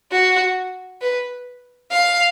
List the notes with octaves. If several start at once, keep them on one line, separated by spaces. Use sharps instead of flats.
F#4
B4
F5